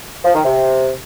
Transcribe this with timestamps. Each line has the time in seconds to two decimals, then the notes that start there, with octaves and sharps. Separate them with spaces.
0.24 F3
0.34 D#3
0.45 C3